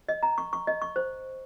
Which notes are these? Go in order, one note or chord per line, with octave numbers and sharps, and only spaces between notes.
D#5
A#5
C#6
C#6
D#5
C#6
C5